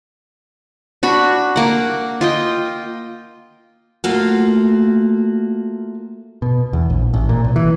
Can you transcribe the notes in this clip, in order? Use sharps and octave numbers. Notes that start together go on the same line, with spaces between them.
D4 F#4 B5
A#3 F#5
F4 D#5 G5
A3 A#3 F4 F#4
B2
E2
A#1
A1
A#2
B1
E3